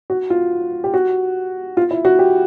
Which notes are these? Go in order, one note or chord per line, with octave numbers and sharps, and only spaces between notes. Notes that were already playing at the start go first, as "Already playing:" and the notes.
F#4
F4
G4
F#4
F4
E4
F#4
G4